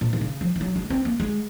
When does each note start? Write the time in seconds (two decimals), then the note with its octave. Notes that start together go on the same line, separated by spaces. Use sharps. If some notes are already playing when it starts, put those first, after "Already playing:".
0.01 A#2
0.13 D#3
0.21 C#3
0.41 F3
0.56 F3
0.61 F#3
0.76 G#3
0.90 C4
1.05 A#3
1.20 G#3